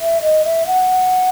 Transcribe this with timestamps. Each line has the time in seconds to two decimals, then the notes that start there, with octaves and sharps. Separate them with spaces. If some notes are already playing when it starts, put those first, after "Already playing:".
0.01 E5
0.22 D#5
0.45 E5
0.67 F#5